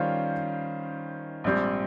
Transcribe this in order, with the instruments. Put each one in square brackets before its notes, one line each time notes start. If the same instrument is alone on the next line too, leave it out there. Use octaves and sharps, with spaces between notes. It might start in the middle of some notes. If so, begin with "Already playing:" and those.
Already playing: [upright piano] D#3 G3 C#4 F4 C5
A#1 G#2 G3 C4 G4